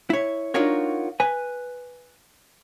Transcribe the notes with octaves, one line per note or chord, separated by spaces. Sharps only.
E4 C#5
D4 D#4 F4 F#4 A#4 C#5
B4 G#5